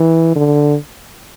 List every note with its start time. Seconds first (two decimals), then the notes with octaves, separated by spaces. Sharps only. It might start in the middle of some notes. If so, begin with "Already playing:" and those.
Already playing: E3
0.36 D3